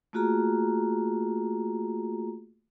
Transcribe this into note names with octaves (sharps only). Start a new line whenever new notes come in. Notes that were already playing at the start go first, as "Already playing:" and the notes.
A3 A#3 F4 F#4 G#4 A#5